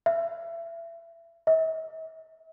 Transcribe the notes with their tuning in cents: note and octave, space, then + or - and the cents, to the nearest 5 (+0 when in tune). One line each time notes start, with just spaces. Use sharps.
E5 +30
E5 -45